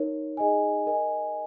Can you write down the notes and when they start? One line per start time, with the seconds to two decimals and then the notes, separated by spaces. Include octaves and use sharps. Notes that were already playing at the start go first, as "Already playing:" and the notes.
Already playing: D#4 A#4 C#5
0.37 D#4 G#4 D#5 G#5
0.87 A#4 D#5 G#5